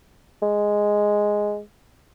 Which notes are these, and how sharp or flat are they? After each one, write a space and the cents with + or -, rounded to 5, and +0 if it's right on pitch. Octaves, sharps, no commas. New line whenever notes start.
G#3 +0